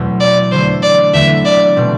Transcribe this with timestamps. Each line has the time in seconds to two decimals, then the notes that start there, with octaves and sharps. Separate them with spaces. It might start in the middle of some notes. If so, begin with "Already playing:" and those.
Already playing: E2 B2 F#3 A3 C4
0.20 D5
0.52 D3 F#3 A3 C5
0.83 D5
1.14 E2 D3 A3 E5
1.45 D5
1.76 B2 A3 C4